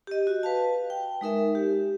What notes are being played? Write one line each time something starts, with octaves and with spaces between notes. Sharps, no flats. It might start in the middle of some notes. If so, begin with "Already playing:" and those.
G4 D#5
F#4
B4 F5 A5
G5
G#3 D#4 A#4 E5
G4